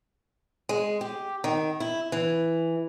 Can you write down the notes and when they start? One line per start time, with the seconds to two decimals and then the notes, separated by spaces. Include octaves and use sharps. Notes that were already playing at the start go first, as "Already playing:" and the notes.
0.69 G#3
1.01 G4
1.44 D#3
1.80 E4
2.12 E3